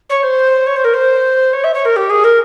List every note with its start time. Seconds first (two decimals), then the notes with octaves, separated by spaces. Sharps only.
0.09 C#5
0.22 C5
0.66 C#5
0.75 C5
0.84 A#4
0.93 C5
1.52 C#5
1.63 E5
1.73 C#5
1.84 A#4
1.96 G4
2.09 G#4
2.23 A#4